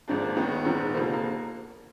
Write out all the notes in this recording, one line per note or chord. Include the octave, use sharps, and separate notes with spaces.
G#1 G#2 F3 D4
A#3
D#2 D#3 B3
B3
A#1 G#2 D#3
F1 F2 D3 F3 A#3
A#3